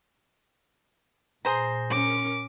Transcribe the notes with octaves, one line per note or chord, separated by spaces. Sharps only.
A#2 G#4 C5 A#5
C#4 A#4 D6